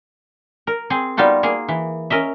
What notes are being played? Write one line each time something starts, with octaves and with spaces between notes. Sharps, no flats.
A#4
C4 G#4
G3 B3 D#4 F4 F#4
A#3 G#4
E3
C#4 A#4 D#5 E5